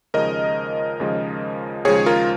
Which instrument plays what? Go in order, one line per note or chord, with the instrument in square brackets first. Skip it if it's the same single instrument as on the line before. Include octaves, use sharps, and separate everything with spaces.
[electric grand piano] D#2 C#3 F3 G#3 A#4 D#5
D#2 C#3 F3 G#3
D#2 C#3 F3 G#3 G#4 C#5
F4 A#4